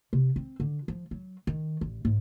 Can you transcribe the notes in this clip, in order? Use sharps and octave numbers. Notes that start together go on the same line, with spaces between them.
C3
C4
D3
F3
F#3
D#3
A1
G#2